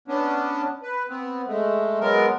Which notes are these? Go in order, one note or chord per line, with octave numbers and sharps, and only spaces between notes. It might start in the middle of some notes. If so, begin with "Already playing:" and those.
B3 C#4 D4
B4
B3 C4
G#3 A3
F#3 G#3 B3 A#4